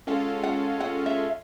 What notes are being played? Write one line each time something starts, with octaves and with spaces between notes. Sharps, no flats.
G#3 C#4 F4 A4 F#5
F#5
F#5
E5